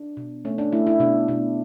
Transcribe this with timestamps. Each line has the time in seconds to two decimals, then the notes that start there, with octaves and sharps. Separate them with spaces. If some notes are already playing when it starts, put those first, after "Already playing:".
Already playing: D4
0.17 B2
0.45 A3 C#4
0.58 D4
0.72 A3 E4
0.87 E4
1.00 B2 D4
1.28 B2 D4